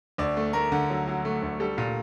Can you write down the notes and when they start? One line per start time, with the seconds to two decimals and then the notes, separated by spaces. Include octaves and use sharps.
0.18 D2 D5
0.37 A3
0.53 A3 A#4
0.72 D3
0.90 F#3
1.07 F#3
1.25 A3
1.42 D2
1.60 G3 A4
1.78 A#2